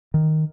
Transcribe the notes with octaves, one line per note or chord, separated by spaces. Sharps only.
D#3